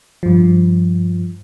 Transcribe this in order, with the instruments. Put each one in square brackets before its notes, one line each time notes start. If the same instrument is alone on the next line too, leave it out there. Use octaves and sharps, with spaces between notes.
[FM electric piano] G2 F3